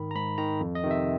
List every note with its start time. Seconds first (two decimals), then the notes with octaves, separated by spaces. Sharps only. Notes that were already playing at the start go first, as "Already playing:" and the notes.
Already playing: G#2 D#3 B5
0.11 A#5
0.15 G#2 B5
0.38 D#3 A#5
0.60 F2
0.75 D#5
0.83 C3 D#3
0.91 E5